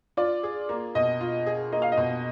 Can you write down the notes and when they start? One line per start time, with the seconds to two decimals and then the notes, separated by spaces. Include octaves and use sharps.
0.17 F4 D5
0.43 G#4
0.69 A#3
0.95 B2 D#5
1.21 F4
1.46 G#4
1.72 A#3 D#5
1.82 F5
1.92 D#5
1.97 B2